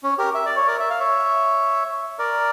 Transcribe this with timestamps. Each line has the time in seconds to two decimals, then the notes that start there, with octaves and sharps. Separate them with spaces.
0.03 C#4
0.18 G4 A#4
0.34 E5
0.46 D5
0.56 C#5
0.67 A#4 D5
0.80 E5
0.90 F5
0.99 C#5 E5
2.19 A#4 D5